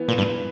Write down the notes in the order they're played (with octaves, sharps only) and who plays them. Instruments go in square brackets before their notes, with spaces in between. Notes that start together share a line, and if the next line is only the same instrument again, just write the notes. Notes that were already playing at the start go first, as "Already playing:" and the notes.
Already playing: [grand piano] E3 B3
[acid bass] A#2
G2